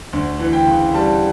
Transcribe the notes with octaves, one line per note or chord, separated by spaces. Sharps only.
D2
E3
G5
C#3
G3 A5